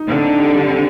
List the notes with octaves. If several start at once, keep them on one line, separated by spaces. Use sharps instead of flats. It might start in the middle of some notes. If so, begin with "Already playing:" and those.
Already playing: D#4
D3 C4
D#4
G4
G3
C4